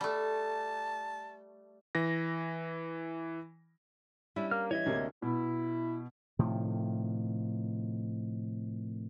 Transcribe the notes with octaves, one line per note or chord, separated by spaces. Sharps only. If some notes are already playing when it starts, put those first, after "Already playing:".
G3 A3 A5
E3 A#6
G3 C#4 D4 E4
A#3 F6
E3 C#5 D#5 E5 G#6
D2 C3 A#3
B2 E4
A2 C3 D#3 F3